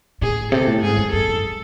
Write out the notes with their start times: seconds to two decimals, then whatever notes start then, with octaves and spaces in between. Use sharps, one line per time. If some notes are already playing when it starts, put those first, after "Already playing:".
0.22 A2 G#4
0.52 C3 A4
0.67 A2
0.82 G#2 G#4
0.98 F#2
1.12 F#2 A4
1.27 F#2